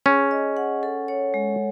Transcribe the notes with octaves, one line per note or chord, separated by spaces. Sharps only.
C#4 G#4
D#5
F#5
A4
C#5
G#3